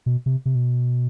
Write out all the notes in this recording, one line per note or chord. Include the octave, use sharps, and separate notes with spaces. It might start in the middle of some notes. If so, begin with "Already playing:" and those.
B2
C3
C3
B2